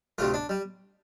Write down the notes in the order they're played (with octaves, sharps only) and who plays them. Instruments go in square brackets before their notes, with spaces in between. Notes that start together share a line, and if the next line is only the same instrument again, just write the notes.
[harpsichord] D2 C3 A3 F4
D4
G3